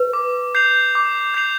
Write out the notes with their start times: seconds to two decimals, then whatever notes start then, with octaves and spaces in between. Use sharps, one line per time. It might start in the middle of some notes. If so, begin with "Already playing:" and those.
Already playing: B4
0.13 D6
0.55 G6 C7 F7
0.95 D6
1.34 G6 C7 F7